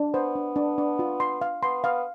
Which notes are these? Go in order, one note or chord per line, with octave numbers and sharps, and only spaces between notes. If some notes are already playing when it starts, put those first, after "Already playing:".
Already playing: D4
B3 C5
D4
D4
D4
F4
C6
F5
B3 C6
B3 F5